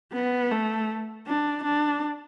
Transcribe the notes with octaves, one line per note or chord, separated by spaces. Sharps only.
B3
A3
D4
D4